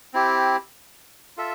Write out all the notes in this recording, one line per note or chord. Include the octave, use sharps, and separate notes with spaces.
C4 E4 G4
F4 A4 E5